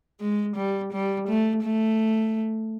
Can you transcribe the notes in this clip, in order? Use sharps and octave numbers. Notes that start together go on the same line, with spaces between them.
G#3
G3
G3
A3
A3